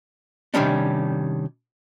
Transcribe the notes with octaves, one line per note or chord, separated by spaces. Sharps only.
C3 D#3 G3 C#4 D4